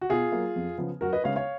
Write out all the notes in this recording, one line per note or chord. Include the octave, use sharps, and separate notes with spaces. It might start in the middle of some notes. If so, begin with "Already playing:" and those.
F#4
B2 F4 G#4
F#3 A#3
F2
C#3 F3 B3
F#2 F#4 A#4
B4 D#5
C#3 G#3 B3 C#5 F5
C#5 F5